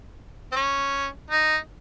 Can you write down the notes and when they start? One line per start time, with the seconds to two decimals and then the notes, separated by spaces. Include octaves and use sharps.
0.52 C4
0.56 C#4
1.31 D#4